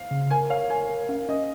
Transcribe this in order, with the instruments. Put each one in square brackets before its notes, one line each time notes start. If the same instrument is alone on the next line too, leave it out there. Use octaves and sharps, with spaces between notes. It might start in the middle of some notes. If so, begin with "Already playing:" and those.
Already playing: [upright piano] F5
[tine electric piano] C#3
[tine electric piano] A#4 [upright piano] G#5
[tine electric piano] C#5 [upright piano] F5
[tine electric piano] A#4 [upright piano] G#5
[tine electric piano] A#4
[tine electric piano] C#4 [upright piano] F5
[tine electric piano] C#4 [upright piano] D#5